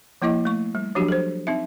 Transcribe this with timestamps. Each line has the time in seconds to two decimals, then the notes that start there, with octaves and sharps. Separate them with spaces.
0.22 F3 A#3 E4 D#5 D6
0.45 A3 C#6
0.75 G3
0.95 F3 F#3 D4 F#4 G4
1.08 A4 C5
1.47 C4 D#4 E5